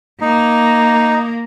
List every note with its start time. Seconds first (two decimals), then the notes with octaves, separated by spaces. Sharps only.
0.21 A#3 D#4